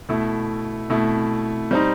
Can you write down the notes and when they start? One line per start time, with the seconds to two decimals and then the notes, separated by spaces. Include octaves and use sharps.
0.09 B2 A3 E4
0.90 B2 A3 E4
1.71 G3 C4 D#4